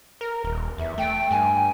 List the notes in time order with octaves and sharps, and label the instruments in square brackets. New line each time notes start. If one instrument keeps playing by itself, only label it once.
[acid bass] A#4
D#1
[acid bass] E2 [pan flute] E5
[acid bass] A3 [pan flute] G5
[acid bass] G2 [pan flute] G#5